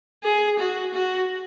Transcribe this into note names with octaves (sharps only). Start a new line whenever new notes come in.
G#4
F#4
F#4